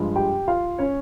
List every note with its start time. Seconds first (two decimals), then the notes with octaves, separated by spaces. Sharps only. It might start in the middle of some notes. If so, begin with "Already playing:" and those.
Already playing: G2 F3 G#3
0.16 G4 G5
0.48 F4 F5
0.78 C#4 C#5